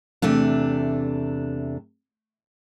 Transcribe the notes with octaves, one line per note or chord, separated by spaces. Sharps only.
E2 C3 A3 D4